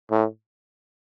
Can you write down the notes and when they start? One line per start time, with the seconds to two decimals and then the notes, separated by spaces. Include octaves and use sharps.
0.11 A2